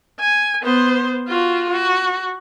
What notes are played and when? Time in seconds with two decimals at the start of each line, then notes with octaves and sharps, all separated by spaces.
0.20 G#5
0.63 B3 C5
1.28 F4 F#4
1.69 F#4